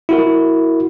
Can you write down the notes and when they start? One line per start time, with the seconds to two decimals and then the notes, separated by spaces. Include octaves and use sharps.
0.09 E4 F#4 A#4